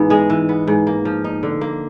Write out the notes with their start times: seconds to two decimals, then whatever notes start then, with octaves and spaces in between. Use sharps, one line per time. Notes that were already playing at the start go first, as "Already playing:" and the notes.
Already playing: G#2 E3 B3
0.10 G#3 G#4
0.30 E3
0.49 B3
0.67 G#2
0.87 A#3
1.05 F3
1.24 D#4
1.43 D3
1.61 A#3